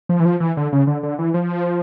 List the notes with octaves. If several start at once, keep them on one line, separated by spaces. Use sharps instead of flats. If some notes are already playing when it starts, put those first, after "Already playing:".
F3
E3
F3
E3
D3
C#3
D3
D3
E3
F3